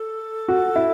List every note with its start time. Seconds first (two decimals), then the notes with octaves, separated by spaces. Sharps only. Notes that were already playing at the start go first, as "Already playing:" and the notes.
Already playing: A4
0.48 F#4
0.76 E4